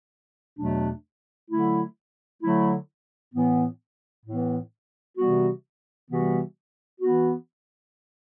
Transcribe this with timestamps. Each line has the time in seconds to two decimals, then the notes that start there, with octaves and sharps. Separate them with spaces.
0.58 E2 B2 F#3 A3 D4
1.51 D3 F#3 A3 E4
2.43 D3 F#3 A3 E4
3.34 A2 E3 B3
4.26 A2 E3 B3
5.18 C3 E3 G3 B3 F#4
6.10 C3 E3 G3 B3 F#4
7.01 E3 B3 F#4